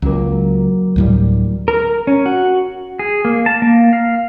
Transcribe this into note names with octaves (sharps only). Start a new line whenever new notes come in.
C#2 F#3 A#3
D2 A2 G3
A#4
C#4
F#4
G#4
A#3
A5
A#3
F5